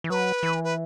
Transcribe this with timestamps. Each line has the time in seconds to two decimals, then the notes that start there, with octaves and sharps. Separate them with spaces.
0.04 E3
0.10 F#3 B4
0.43 E3
0.64 B4